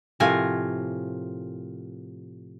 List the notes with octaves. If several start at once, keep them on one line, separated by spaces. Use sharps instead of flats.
A2 C3 F3 A#4 G#5